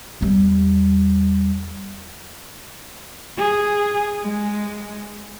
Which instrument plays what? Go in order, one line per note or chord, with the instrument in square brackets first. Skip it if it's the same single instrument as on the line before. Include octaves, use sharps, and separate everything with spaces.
[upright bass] E2 G3
[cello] G#4
G#3